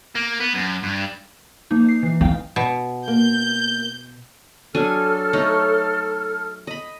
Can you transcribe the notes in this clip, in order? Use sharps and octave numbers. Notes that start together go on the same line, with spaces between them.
A#3
B3
F#2
G2
F3 A#3 D#4
C7
E3
D#4 E4 F5 G5
B2
A#3 G6
F#3 D4 A4 G#5 F6
A3 D#4 C#5
D#5 B5